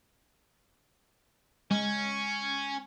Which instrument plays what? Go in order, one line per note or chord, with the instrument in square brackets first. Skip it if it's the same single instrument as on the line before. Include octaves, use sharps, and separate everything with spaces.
[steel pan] G#3 [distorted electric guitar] C#4